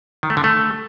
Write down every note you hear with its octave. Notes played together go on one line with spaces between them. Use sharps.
D#3
A3
D3
A3